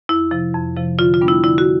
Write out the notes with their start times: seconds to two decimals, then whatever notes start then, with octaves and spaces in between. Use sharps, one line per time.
0.09 F2 E4
0.31 C3 F3
0.55 F2
0.76 C3 F3
0.99 D3 F4
1.14 F4
1.21 G3 B3 D4
1.28 E4
1.44 D3 E4
1.58 F#4